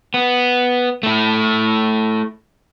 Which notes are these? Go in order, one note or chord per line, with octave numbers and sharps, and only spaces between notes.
B3
A3 E4